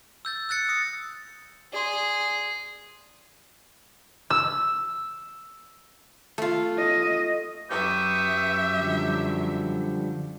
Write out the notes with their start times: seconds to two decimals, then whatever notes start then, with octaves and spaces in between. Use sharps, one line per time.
0.25 E6 G6 A6
0.49 E6 F#6 A6 C#7
0.69 D#6 A#6 C#7
1.73 G#4 D5 C6
4.30 E6
6.38 A3 F4
6.78 D#5
7.70 F#2 F#3 G4 B4 E5 C#6 D#6
8.78 D3 F3 G3